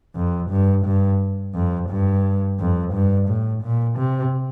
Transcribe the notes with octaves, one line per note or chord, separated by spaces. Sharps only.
F2
G2
G2
F2
G2
F2
G2
A2
A#2
C3